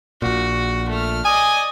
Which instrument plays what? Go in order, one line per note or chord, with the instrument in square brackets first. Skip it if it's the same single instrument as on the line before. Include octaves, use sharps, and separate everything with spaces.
[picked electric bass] A#1 A#2 [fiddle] F#4
[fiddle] A3 F6
[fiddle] D5 D#5 [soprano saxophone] G#5 [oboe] D#6